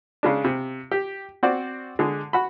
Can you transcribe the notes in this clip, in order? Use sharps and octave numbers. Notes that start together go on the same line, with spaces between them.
C#3 G#3 D4
C3
G4
C4 F#4 D5
D3 G#3
F#4 B5